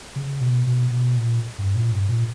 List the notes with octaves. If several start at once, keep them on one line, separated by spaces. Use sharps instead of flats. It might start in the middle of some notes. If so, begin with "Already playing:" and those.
C#3
B2
B2
B2
A#2
G2
A#2
G2
A#2